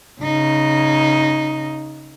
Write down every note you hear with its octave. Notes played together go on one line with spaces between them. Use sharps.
C#3 D#4